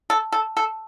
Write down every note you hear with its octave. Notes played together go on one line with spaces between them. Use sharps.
A4
A4
A4